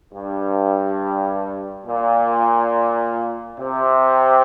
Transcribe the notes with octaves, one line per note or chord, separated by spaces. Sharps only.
G2
A#2
C3